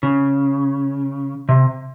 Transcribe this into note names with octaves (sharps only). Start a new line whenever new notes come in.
C#3
C3